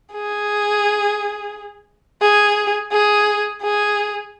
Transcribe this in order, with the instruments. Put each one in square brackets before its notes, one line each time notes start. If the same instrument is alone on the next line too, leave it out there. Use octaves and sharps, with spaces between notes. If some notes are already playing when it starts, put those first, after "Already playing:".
[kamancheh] G#4
G#4
G#4
G#4